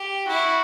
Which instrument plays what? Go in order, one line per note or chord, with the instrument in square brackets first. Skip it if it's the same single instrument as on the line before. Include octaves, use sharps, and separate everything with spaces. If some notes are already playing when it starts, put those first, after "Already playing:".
Already playing: [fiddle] G4
[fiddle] E4 [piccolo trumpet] F#4